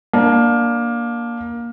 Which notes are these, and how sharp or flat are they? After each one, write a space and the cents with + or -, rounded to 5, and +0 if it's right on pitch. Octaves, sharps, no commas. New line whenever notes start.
A#3 +15 D4 +0